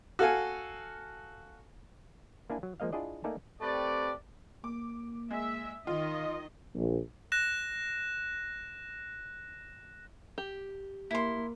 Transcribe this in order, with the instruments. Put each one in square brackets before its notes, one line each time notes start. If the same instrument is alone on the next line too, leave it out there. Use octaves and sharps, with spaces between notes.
[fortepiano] F#4 A4 F5 G#5
[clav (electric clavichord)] A#3 D4 E4 G#5
F#3
F3 G#3 A#3 D#5 F5
D4 E4 F4 G#4 D5 D#5
A3 A#3 D#4 D5 G#5 A5
[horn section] A3 C4 G4 B4 D5
[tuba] A#3 [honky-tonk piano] D6
[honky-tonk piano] G#3 [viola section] E5
[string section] D#3 [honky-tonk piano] F4 [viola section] D#5
[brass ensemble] A#1
[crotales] F#6 A#6 E7
[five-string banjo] G4
[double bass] A#3 [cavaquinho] E4 C6